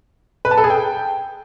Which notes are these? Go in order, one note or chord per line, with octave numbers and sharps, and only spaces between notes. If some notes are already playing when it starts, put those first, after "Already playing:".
B4
A5
A4
G#4
G5